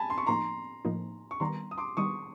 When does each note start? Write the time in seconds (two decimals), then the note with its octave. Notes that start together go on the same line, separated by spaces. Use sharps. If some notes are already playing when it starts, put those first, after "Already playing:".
Already playing: G#5 A5 B5
0.10 C6
0.18 C#6
0.27 A2 F3 A#3 D#4 A#5 C6
0.85 A2 F3 A#3 D#4
1.31 C#6
1.40 D#3 G3 B3 A#5 C6
1.71 D#6
1.77 C6 D6
1.97 D#3 G3 B3 C#6 D#6